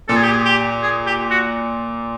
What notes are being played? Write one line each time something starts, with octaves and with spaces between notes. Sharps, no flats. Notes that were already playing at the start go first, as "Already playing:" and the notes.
A#2 A4
G#4
G4
G#4
G4
G#4
G4
F#4